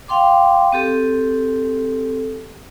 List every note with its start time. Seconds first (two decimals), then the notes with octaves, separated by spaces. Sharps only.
0.08 F5 G5 C6 D6
0.72 C4 G4 A4